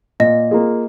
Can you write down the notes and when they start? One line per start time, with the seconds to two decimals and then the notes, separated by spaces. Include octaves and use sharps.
0.20 A#2 D#5
0.51 A#3 F4 G#4